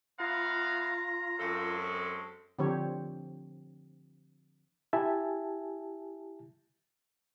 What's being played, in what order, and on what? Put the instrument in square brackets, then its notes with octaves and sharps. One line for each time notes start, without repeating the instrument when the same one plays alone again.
[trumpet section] B3 E4 F5 [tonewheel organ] F4 [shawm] A#5
[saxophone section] F#2 A4 [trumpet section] G#3 C4 C#4
[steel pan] D3 F3 C4 G4 C#5
[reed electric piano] E4 G4 E5 G#5 A5